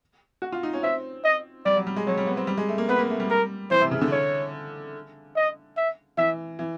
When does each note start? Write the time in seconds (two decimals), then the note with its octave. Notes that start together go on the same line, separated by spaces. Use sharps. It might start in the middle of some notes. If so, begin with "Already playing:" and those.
0.42 F#4
0.52 F4
0.63 D#4
0.73 C#4
0.83 C4 E5
1.24 D#5
1.65 G3 D5
1.76 F#3
1.87 G3
1.96 G#3
2.07 F#3 C#5
2.18 G3
2.27 B3
2.37 C4
2.47 G3
2.57 G#3
2.69 A3
2.78 A#3
2.89 B3 B4
2.99 A#3
3.10 A3
3.20 G3
3.30 A#4
3.71 E3 C5
3.81 C3
3.91 C#3
4.01 D3
4.12 C#5
5.36 D#5
5.77 E5
6.17 E3 E5
6.59 E3